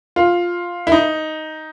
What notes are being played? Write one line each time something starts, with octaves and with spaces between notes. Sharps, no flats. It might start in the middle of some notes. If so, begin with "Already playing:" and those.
F4
E4
D#4